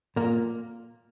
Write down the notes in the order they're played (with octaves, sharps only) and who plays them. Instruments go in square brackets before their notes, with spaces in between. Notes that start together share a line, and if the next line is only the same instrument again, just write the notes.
[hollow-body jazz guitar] A#2 A#3